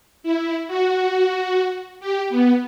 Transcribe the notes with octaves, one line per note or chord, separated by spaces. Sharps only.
E4
F#4
G4
B3